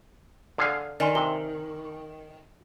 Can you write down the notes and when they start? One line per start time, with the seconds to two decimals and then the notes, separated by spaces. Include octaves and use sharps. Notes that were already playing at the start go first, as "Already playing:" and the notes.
0.58 D3 G#4 F5
1.00 D#3 D5 G#5 C6
1.15 C3 G7